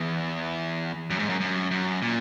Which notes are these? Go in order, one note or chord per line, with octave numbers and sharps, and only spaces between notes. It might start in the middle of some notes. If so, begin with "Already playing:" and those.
Already playing: E2
F#2
G#2
F#2
F#2
F#2
A#2